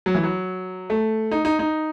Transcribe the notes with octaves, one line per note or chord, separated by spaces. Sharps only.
F#3
E3
F#3
A3
D#4
D#4
D#4